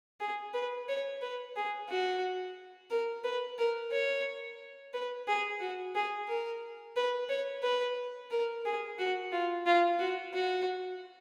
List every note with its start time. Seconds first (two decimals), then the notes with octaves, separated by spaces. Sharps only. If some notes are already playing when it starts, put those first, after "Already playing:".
0.20 G#4
0.54 B4
0.89 C#5
1.21 B4
1.56 G#4
1.90 F#4
2.90 A#4
3.24 B4
3.58 A#4
3.92 C#5
4.93 B4
5.27 G#4
5.60 F#4
5.95 G#4
6.28 A#4
6.96 B4
7.29 C#5
7.63 B4
8.31 A#4
8.65 G#4
8.98 F#4
9.32 F4
9.66 F4
9.99 F#4
10.33 F#4